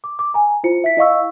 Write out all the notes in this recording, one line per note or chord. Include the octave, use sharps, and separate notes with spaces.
D6
D6
G#5 A#5
E4 F4 C5 C#7
E5 B6
E4 D#5 F5 C#6 E6